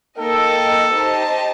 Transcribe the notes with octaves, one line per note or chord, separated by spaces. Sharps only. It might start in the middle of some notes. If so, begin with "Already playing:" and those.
A#3 D#4 A4 A#4 D#5 G5
D#4 G4 C5 D#5 A5